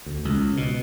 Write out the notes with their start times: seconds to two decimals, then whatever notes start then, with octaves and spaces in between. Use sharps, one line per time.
0.06 D2
0.25 C#2
0.57 B2